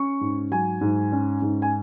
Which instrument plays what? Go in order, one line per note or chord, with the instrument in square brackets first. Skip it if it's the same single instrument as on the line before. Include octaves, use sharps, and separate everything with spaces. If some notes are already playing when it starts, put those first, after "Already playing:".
Already playing: [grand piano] C#4 C#6
G#2
F#3 G#5
G#2
C#4
G#2
G#5